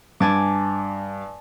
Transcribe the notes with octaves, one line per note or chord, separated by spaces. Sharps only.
G2 G#5 A5 D6